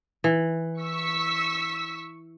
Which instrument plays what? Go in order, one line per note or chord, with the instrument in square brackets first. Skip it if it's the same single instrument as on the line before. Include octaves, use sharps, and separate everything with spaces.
[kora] E3
[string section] C#6 E6 B6